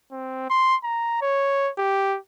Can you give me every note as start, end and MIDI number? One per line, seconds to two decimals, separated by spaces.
0.12 0.46 60
0.50 0.76 84
0.83 1.19 82
1.21 1.70 73
1.78 2.18 67